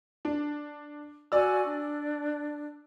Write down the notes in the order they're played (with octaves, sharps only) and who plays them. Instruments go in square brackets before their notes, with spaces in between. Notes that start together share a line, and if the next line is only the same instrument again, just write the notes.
[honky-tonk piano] D4
[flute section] F#4 G#5 [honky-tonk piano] D5 E6
[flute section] D4